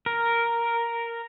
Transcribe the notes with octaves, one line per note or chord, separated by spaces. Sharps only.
A#4